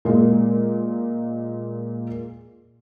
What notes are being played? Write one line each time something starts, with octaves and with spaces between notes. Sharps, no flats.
A#2 G#3 A#3